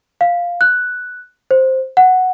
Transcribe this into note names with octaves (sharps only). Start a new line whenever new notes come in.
F5
F#6
C5
F#5